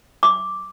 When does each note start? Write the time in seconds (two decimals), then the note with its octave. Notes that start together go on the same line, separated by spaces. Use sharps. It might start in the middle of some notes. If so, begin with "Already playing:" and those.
0.23 D6